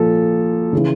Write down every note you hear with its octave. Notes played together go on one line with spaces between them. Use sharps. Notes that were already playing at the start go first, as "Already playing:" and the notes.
Already playing: A#2 F3 A4
C#3 E3